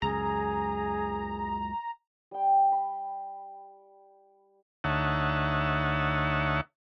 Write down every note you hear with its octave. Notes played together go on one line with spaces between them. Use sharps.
C#2 F#2 G#4 A#5
G3 G5
B5
D2 D#4 C#5 E5 F#5 A5